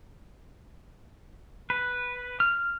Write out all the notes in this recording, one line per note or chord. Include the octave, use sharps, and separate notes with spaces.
B4
F6